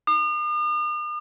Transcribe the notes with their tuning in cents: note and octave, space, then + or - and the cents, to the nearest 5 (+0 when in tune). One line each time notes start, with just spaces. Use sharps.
D#6 -45